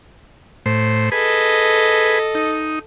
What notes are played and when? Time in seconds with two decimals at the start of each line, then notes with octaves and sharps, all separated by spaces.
0.66 A2 C5
1.12 G#4 A4 B4 D#5
2.35 D#4